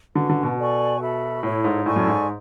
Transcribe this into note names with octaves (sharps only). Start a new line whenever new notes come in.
D3 C#4 F#4 B4
D3
B2
A4 D5 G#5 C#6
F#4 A4 E5 B5
A2 E4 A4 C#5
G#2
A2 A4 D5 G#5 C#6
F#2
G#2